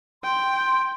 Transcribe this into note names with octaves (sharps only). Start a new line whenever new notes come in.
G5 C6